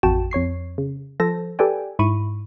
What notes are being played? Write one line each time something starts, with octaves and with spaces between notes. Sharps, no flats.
A1 F2 F#4 G5 A5 E7
F2 C#5 C#6 C7
C#3
F3 A4 C5 A5 A#6
G4 A4 B4 D5 G5 G#5
G#2 E4 B5 C#6 D#7